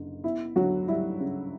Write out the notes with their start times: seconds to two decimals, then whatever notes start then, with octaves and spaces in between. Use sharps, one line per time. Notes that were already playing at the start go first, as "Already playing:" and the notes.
Already playing: F#1 D3
0.23 B3 E4
0.56 D2 F#3 F#4
0.88 G3 E4
1.20 C#3